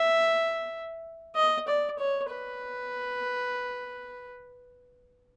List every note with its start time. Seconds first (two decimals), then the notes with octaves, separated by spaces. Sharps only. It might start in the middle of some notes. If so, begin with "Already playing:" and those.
Already playing: E5
1.36 D#5
1.68 D5
1.99 C#5
2.31 B4